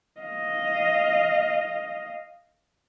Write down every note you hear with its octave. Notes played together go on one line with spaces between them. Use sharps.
D#5 F5